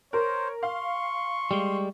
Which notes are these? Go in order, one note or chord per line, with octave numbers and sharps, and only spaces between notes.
A#4 C5 C#5
F5 C6 C#6
G3 G#3